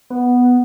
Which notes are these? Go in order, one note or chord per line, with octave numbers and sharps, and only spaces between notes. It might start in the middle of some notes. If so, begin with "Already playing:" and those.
B3